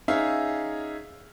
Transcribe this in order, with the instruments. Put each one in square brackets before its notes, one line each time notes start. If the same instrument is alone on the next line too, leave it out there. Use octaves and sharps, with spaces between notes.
[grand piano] C#4 D#4 G#4 E5 F5